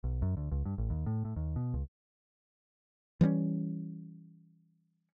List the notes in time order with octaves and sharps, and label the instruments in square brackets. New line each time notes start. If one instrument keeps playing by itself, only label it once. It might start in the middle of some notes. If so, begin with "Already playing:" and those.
[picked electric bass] B1
F#2
D2
C#2
G2
A1
D#2
A2
A2
D#2
B2
C#2
[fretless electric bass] E3 G3 C4 C#4